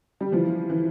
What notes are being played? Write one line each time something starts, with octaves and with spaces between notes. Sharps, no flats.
G3
E3 F3
E3